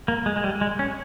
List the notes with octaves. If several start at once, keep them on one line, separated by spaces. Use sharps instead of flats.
A#3
G#3
G#3
G3
G#3
C#4